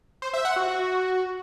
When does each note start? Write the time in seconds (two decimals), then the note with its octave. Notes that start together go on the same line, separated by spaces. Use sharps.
0.22 C5
0.34 E5
0.45 F#5
0.56 F#4
0.68 F#4